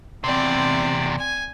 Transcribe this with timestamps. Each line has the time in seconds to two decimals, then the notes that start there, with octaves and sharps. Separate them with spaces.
0.24 E2 C3 C4 D5
1.19 G#5